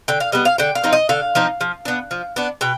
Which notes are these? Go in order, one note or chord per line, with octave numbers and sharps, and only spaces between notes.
D3 G5
F5
G3 B3 D#5
F5
D3 G5
F5
F3 C4 D#4
D#5
D3 F5
F3 C4 D#4
F3
B3 D4
F3
B3 D4
B2 G5